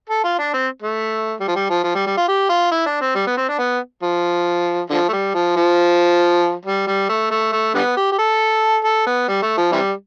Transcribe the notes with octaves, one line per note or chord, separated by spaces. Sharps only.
A4
F4
D4
C4
A3
G3
F3
G3
F3
F3
G3
G3
F4
G4
F4
E4
D4
C4
G3
B3
C4
D4
B3
F3
D3 F3
A3
G3
F3
F3
G3
G3
A3
A3
A3
D3 G3 B3
G4
G4
A4
A4
B3
G3
A3
F3
C3 E3 G3